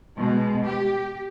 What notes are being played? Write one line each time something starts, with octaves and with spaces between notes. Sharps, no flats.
B2 G#3
G4